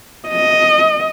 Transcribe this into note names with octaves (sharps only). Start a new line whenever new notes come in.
D#5